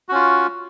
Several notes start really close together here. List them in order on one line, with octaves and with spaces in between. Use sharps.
F#4 C#4 F4